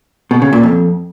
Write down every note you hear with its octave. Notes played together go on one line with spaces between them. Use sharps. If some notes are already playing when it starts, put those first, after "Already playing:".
B2
C#3
A#2
F2